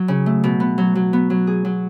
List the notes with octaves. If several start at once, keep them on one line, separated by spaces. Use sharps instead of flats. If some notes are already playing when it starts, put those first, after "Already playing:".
Already playing: F#3
C#3
A3
B2
B3
F#3
F#3
B3
F#3
G#4
F#3